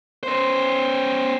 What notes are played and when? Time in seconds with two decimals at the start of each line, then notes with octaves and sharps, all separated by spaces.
0.23 C#4 C5